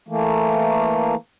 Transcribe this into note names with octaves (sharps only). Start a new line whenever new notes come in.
E3 A3 A#3